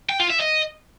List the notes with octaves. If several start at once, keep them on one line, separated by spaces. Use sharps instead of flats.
G5
F4
E5
D#5